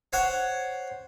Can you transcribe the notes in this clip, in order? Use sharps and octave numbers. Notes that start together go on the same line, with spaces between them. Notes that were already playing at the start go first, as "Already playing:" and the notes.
C5 C#5 F#5